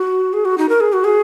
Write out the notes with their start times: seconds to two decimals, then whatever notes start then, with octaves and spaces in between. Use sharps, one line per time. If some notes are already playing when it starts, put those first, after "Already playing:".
Already playing: F#4
0.33 G#4
0.45 F#4
0.58 D#4
0.69 A#4
0.81 G#4
0.93 F#4
1.04 G#4